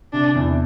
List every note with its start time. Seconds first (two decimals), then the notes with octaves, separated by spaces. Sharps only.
0.13 C3 D4
0.35 E2